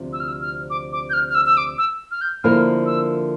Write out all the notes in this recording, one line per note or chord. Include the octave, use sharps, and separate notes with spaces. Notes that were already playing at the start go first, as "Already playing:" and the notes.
Already playing: D2 C3 F3
E6
F6
E6
F6
D6
D6
G6
F6
F6
E6
E6
D6
E6
F6
G6
D3 F3 A#3 E4 A#4 F6
E6